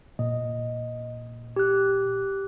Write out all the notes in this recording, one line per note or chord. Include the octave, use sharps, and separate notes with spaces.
A#2 D#5
G4 F#6